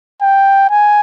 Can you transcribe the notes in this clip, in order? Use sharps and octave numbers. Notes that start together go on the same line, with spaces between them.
G5
G#5